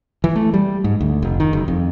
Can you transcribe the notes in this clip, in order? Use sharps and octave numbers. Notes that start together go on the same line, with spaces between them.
E3
A3
G3
G#2
D2
F1
D#3
F#1
F2